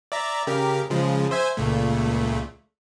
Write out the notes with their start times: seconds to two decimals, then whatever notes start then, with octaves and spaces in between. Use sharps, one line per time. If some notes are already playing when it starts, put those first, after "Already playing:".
0.12 D5 E5 A#5
0.47 C#3 G4 A#4
0.91 C#3 F3 G#3
1.31 C5 E5 G#5
1.57 C#2 A#2 A3